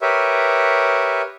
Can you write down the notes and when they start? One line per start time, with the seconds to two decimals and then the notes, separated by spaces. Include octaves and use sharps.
0.02 G4 A#4 B4 C#5 E5